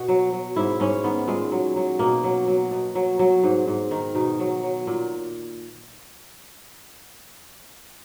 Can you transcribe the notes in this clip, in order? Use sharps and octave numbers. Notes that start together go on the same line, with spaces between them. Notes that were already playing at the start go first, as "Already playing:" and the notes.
Already playing: B2 F#4
F#3
F#3
G#2 E4
G#2 C#4
D#3 B3
A#2 G#3
F#3
F#3
B2 A#3
F#3
F#3
B2
F#3
F#3
G#2
G#2
D#3
B2 D#4
F#3
F#3
A#2